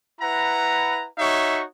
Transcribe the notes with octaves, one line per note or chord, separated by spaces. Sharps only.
E4 B4 F#5 A#5
D#4 F#4 C#5 E5 C#6